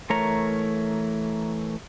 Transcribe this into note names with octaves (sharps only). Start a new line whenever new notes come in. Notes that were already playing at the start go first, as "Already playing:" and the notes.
E3 A3 A#4 C#5 A#5